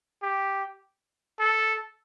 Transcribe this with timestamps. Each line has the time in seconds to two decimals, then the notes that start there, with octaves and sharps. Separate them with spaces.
0.22 G4
1.40 A4